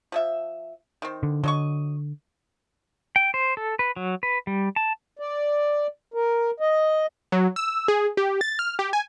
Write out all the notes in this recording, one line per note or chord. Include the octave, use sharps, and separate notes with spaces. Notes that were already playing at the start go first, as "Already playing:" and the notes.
F3 G#4 E5
D#3 C4
D3
D3 F#3 D#5 C#6
G5
C5
A4
B4
F#3
B4
G3
A5
D5
A#4
D#5
F#3
E6
G#4
G4
A6
F6
G4
G#5